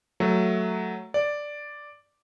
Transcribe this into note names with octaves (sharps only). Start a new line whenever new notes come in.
F#3 A3
D5